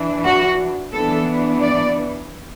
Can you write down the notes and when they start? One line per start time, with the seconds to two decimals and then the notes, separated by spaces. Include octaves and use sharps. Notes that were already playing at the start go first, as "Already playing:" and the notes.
Already playing: E3 D4
0.24 F#4
0.92 E3 B3 D4 A4
1.62 D5